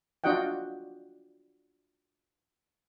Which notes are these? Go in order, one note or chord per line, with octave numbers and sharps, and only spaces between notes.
D4 F4 F#4 D#5 F#5 G5